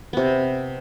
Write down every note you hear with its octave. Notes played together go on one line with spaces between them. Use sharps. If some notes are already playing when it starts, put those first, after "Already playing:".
C3 B3